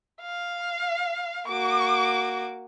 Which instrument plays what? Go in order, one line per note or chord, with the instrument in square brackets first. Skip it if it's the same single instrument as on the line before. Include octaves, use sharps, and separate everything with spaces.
[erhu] F5
[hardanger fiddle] A#3 F#4 [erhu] D6